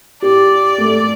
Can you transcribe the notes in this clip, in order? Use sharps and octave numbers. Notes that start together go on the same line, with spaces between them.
G4 D5
A3